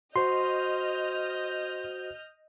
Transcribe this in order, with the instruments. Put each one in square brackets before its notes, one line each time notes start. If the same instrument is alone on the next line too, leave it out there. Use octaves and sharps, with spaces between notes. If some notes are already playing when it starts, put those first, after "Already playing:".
[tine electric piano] F#4 C5 [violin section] D#5 F6 G6 [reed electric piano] C6